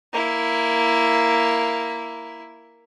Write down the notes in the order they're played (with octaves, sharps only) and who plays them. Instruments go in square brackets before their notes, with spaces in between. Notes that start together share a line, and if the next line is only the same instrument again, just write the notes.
[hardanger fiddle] A#3 E4